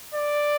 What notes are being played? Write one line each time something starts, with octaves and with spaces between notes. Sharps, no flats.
D5